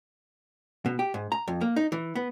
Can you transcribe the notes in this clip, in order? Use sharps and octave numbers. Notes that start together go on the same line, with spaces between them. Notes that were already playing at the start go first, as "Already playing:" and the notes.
B2
G4
G#2
A#5
F2
A#3
D#4
E3
B3